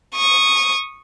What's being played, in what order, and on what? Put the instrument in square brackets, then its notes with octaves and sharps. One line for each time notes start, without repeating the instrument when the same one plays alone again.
[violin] C#6 D#6